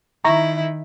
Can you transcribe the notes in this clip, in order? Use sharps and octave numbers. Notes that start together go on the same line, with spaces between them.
D#3 E4 A#5 C#6 A#6